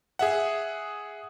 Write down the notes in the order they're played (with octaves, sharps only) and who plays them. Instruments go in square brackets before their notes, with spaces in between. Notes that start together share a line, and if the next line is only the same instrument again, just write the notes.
[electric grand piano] G#4 E5 F#5